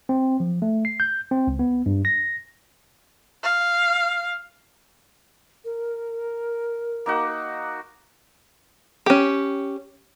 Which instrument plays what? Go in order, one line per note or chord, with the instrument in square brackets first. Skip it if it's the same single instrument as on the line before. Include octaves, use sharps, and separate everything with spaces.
[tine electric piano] C4
F3
A3
C7
G6
C4
C#2
B3
G2
A#6
[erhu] F5
[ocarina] A#4
[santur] A#3 D#4 F#4
[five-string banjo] C#4 G4